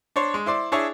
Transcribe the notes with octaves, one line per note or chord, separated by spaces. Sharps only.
D4 C5 C#5
G#3
E4 C5 D5
D4 E4 G#4 C#5